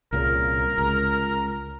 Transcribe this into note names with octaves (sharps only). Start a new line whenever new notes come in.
C2 A#2 C#3 A#4
C#2 A#5